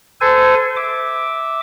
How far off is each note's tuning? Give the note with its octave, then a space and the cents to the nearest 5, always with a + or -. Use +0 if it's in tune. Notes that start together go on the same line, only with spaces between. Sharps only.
A4 +0 C5 -30 G#5 +0
E5 -10 D6 +0